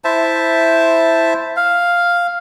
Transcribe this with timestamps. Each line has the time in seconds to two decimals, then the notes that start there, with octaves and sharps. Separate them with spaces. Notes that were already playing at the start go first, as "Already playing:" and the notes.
0.04 E4 C5 E5 A5
1.56 F5